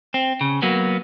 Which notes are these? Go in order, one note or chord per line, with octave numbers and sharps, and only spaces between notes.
C4
C#3
F#3 A#3 B3